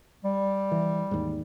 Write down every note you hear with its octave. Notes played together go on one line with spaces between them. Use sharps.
G3
E3
D#2 G#2